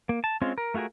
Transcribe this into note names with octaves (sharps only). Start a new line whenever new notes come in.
A#3
A5
G#3 C4 C#4 F4
A#4
A3 F4 F#4 G#4 A#4